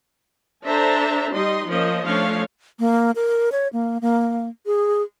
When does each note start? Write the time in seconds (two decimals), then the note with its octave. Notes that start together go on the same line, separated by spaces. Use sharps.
0.66 D4 A4 C5 E5 A5 A#5
1.32 G3 D#4 D#5 C6
1.68 F3 A#3 C#4 C5 D#5
2.06 F3 A3 C#4 D4 C#5 F5
2.79 A#3
3.15 A#4
3.52 C#5
3.73 A#3
4.01 A#3
4.66 G#4